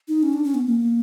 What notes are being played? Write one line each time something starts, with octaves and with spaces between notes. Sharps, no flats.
D#4
C#4
D4
C#4
B3
A#3